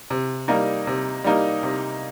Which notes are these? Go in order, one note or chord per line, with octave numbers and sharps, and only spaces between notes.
C3
G3 A#3 D#4
C3
G3 A#3 D#4
C3